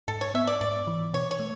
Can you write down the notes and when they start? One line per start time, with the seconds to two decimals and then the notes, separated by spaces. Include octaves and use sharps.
0.08 G#2 A4
0.21 C#5
0.34 B3 E5
0.47 D5
0.61 G#2 D5
0.87 E3
1.13 B2 C#5
1.31 C#5
1.40 A3